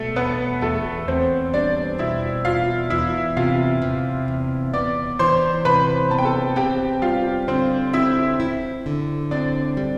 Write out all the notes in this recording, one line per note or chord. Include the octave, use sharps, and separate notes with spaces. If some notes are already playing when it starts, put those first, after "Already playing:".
Already playing: B2 G3 A3 A4
E2 B3 B4
E2 A3 A4
E2 C4 C5
G3 D4 D5
B2 E4 E5
E2 F4 F5
E2 E4 E5
C3 F4 F5
C3
E2
B3 D5 D6
E3 C5 C6
C3 B4 B5
B3 A5
G5
A4 A5
C4 G4 G5
G3 F4 F5
D3 C4 C5
C4 E4 E5
E4
D3
C4 D4 D5
G3